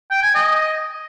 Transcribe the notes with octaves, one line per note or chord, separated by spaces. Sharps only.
G5
G#5
D#5